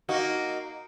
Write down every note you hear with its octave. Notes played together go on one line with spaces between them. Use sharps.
A#3 D#4 F#4